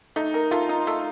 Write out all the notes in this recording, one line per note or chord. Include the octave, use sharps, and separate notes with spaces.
A3 D#4
A#4
A3 F4
D#4
A3